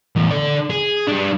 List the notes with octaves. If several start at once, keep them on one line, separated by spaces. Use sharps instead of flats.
E2 A2
D3 D5
G#4
G3 D4